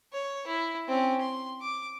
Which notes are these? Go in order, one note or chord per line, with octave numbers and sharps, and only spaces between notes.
C#5
E4
C4 C#4
C6
D6